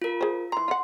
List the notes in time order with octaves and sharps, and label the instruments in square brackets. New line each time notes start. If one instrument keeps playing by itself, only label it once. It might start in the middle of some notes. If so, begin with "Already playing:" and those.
[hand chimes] F4 A#4
[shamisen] G#4 C5
[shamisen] E3 A#5 [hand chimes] C6
[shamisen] F4 F#5